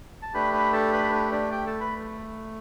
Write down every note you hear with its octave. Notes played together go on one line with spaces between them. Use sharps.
A5
A3 D4 G4 B4 B5
B4 B5
A4 A5
B4 B5
B4
D4 D5
G4 G5
A4 A5
B4 B5